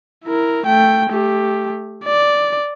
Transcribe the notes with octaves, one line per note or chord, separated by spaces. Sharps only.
E4 A#4
A3 G5
A3 G4
D5